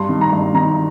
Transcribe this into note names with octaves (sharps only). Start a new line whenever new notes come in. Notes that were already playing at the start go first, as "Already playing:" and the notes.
Already playing: G2 C6
D#3
A#5
G2
D#3 A#5